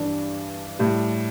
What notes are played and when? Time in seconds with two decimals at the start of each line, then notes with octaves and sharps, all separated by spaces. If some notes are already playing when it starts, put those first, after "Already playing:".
Already playing: G2 E3 G3 D4
0.79 A2 G3